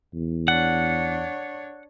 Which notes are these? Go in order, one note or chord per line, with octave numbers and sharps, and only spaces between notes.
E2
D4 C#5 F#5